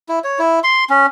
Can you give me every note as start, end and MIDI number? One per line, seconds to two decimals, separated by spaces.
0.09 0.19 64
0.24 0.39 73
0.39 0.60 64
0.63 0.85 84
0.90 1.06 61